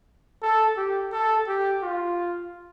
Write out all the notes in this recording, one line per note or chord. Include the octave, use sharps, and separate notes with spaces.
A4
G4
A4
G4
F4